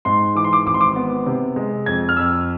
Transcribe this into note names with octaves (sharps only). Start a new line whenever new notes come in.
G#2 C6
E3 D6
C6
D6
G#1 D6
C6
D6
B3
C3
G#3
F2 G#6
F6
F2 E6